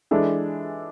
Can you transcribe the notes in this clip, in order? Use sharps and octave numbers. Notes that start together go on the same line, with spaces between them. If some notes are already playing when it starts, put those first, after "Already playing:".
E3 G#3 D4 A4